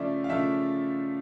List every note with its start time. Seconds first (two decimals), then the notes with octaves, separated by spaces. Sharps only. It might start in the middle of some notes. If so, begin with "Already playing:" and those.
Already playing: C#3 F3 A3 D5 E5
0.24 F5
0.29 C#3 F3 A3 E5